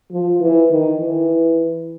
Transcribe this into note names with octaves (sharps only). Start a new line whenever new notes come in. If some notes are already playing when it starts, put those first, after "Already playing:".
F3
E3
D#3
E3